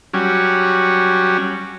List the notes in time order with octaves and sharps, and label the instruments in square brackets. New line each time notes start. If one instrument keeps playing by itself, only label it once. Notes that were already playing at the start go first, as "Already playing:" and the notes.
[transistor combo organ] F#3 G3 C#4